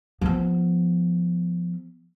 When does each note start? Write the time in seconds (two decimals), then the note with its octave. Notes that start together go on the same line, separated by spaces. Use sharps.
0.21 F3 B3